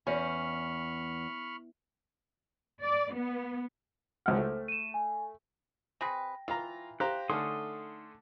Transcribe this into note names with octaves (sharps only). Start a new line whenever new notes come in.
E2 C#4 B5 C#6 F6
D5
B3
G#1 C#2 C5 F#5 F6
A3
D#7 E7
G#5
C4 G#4 B4 G5 A#6
E3 F4 F5 A#5
G4 C5 F5 A#5 F#6
D3 A3 C#4 D#4 C6 D#6 F6